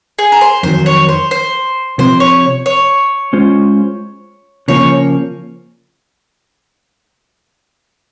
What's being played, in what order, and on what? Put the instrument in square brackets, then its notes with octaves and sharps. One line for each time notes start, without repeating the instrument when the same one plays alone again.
[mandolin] G#4
A#4
C5
[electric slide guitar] F2 D#3 F#3 [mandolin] C5
[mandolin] C#5
C5
C5
[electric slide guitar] C3 F3 C4 [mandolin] C5
[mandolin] C#5
C#5
[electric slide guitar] G#3 C#4 F4 C5
[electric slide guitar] C#3 F3 A#3 C#4 [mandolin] C#5